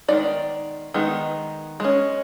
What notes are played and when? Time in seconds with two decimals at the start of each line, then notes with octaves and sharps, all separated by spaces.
0.08 D#3 G#3 B3 D#4 D5
0.94 D#3 G#3 B3 D#4
1.80 G#3 C#4